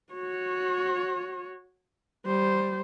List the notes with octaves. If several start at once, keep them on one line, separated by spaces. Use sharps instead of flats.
F#4 C#5
G3 C5